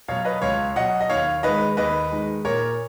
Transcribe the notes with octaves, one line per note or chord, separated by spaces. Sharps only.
B2 F#3 C#5 F5
B4 D#5
C#2 C#5 F5
B2 F#3 D#5 F#5
D#5
D#2 C#5 F5
D#3 G#3 B4 D#5
D#2 B4 D#5
D#3 G#3
A#2 A#4 C#5